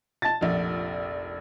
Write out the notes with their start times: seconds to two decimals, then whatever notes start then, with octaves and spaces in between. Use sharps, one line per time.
0.22 A5 A6
0.41 F1 A#1